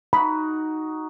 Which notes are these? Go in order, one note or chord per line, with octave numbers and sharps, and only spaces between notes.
D#4 F#4 B5